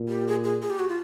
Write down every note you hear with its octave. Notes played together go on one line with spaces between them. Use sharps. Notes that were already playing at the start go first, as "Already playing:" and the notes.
Already playing: A#2
G4
G#4
G#4
G#4
G4
F#4
F4